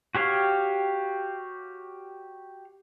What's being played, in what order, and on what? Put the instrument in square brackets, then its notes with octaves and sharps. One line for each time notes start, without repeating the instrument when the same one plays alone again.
[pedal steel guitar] F#4 G4 C#5 F5